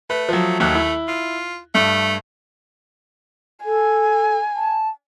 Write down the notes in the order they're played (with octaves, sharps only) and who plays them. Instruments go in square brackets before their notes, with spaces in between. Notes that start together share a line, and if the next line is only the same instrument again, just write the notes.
[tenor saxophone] A3 [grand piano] B4
[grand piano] F3 F#3
[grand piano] D#2 F#3 F#6 [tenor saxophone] A3
[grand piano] E4
[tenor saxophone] F4
[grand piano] G2 [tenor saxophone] A3
[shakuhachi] A4 [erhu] G#5
[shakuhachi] A5